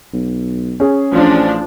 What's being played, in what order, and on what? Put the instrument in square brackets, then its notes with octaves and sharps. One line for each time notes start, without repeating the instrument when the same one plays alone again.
[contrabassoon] B1
[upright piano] C#4 G#4
[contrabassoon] A1 [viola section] F3 D4